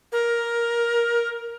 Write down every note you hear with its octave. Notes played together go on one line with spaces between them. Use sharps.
A#4